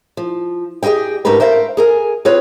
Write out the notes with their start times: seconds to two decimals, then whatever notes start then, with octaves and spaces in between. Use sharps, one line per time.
0.17 F3
0.83 G4 G#4 C#5 D#5 G5
1.25 G#2 A3 D4 G4 A#4 B4
1.40 A#4 C5 E5 F5 G5
1.77 G#4 A#4 G#5
2.25 C4 F4 G#4 B4 C#5